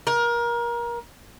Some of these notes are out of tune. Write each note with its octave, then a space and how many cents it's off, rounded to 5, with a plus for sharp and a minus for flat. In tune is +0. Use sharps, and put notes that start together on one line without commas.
A#4 +25